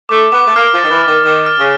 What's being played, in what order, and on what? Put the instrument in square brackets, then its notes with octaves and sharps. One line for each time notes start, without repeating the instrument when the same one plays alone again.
[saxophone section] A3 [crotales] D6
[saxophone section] B3 [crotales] D6
[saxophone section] A3
[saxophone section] A#3 [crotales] F6
[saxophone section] F3
[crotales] A6
[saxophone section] D#3
E3
[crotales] D6
[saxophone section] D#3
[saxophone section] D#3 [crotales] D6
[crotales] F6
[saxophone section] C#3